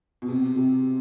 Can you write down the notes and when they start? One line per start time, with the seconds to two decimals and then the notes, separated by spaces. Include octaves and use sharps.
0.22 B2
0.28 C3
0.56 C3